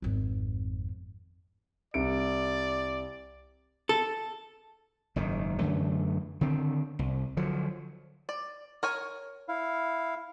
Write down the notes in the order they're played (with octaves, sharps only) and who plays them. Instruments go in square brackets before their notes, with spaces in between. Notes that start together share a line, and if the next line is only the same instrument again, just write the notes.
[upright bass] G#1 F2
[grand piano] C2 D7 [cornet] D5
[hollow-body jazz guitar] A4
[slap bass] F#1 G#2 D#3
F#2 D3 E3 A3
D3 D#3 C4
C2
D3 F3 F#3
[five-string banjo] D5
A#4 C#5 G#5
[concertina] E4 F5